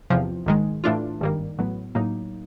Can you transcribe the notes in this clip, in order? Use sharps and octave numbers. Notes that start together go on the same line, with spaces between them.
E2 C3 F3
A#1 G#2 D#3 G#3
A2 E3 A3 D4 F4
G#1 G2 D#3 G3 A#3
A1 A2 F#3 B3
A2 F#3 A#3 D#4